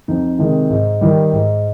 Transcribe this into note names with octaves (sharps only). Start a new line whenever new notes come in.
F2 D#4
C3 D#3 G#3
G#2
D#3 G3
G#2